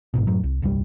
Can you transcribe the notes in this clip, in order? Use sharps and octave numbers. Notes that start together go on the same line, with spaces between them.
A1 G#2 B2
F#2 A2 F#3
C2
D#1 C2 G2 G3